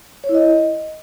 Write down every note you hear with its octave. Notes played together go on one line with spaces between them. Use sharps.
C#5
E4
D#5